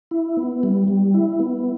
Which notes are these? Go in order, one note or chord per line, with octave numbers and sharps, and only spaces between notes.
E4
B3
G3
G3
E4
B3